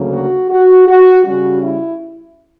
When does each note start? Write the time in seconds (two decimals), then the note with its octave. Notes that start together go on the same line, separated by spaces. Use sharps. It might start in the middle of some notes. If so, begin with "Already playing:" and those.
Already playing: D2 C#3 F#3 A#3
0.13 F#4
0.50 F#4
0.87 F#4
1.25 C#3 G3 C#4 F#4
1.62 E4